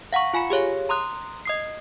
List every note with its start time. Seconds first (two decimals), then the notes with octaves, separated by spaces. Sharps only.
0.13 F5 F#5 A#5 C#6
0.33 F4 G#5 B5 C#7
0.50 G4 G#4 C#5 F5
0.89 A#5 C6 D#6 F#6
1.45 D#5 D#6 C7